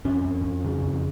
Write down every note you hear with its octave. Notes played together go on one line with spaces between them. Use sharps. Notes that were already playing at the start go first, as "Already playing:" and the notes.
F2 C#4
F2
F2
C#3
F2